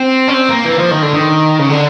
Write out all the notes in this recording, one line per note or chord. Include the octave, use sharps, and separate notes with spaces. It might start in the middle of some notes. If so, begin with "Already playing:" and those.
Already playing: C4
C#4
C4
A#3
E3
F3
D#3
D3
D#3
C#3
D3